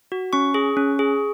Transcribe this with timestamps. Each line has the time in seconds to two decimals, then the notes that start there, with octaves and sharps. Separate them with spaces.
0.12 F#4
0.33 C#4 C#6
0.54 G#4
0.77 C#4
0.99 G#4